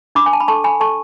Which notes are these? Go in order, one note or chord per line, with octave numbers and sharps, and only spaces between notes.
D4 B5 D6
G#5
A5
B5
A4 A5 C#6
G#5 B5
A4 A5 C#6